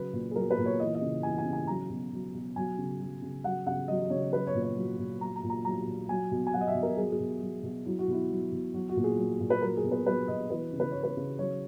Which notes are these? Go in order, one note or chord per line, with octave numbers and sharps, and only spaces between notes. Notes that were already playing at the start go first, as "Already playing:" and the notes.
Already playing: C#3 F#3 B4
A#2
G#4
F#3 A#4
B4
A#2
C#5
E3 D#5
D#5
C#3
E3 G#5
G#5
C#3
G#5
F#3 A#5
B2
F#3
B2
F#3 G#5
C#3
F#3
C#3
F#3 F#5
C#3 F#5
F#3 D#5
C#3 C#5
F#3 B4
C#5
A#2
C#5
F#3
A#2
F#3 A#5
A#5
A#2
A#5
F#3 A#5
A#2
F#3 G#5
B2
G#5
F#3 F#5
D#5
E5
B2
A#4
F#3 G#4
G#4
B2
F#3
B2
F#3 E4
F#4
B2 E4
F#3
B2
F#3 F#4
F#4
A#2
G#4
F#3
A#2
B4
F#3 A#4
G#4
B2
B4
F#3 B4
B2 D#5
E3 B4
C#3
B4
E3 C#5
B4
C#3
F#3 C#5